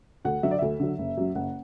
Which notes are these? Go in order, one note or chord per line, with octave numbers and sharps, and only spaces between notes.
D2 F#5
D3 F#3 E5
D5
D2 E5
D3 F#3
F#1
F#2 F#3
F#1 F#5